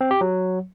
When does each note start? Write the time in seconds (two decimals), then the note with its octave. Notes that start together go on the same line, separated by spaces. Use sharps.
0.01 C4
0.11 G4
0.21 F#3